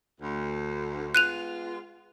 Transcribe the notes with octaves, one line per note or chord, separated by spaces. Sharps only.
D2
G#3 B3 F4 F#6 D#7 F7